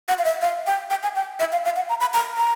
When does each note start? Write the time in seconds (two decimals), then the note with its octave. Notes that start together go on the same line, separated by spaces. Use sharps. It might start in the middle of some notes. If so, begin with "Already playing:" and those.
0.08 F#5
0.18 F5
0.25 E5
0.42 F5
0.67 G5
0.90 G5
1.03 G#5
1.15 G5
1.40 E5
1.52 F5
1.65 F5
1.76 F#5
1.89 A#5
2.00 B5
2.14 A#5
2.37 A#5